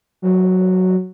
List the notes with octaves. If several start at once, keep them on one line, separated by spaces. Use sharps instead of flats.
F#3